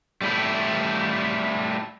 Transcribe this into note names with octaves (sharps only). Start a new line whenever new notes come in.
G3 A3 E4